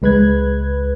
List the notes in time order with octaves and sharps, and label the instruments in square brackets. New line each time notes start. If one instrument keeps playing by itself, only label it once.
[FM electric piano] C#2 G#3 B4 F#6 G#6